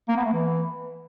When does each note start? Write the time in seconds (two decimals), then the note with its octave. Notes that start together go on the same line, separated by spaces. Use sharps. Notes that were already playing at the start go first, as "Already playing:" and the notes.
0.09 A#3
0.17 B3
0.25 A3
0.33 E3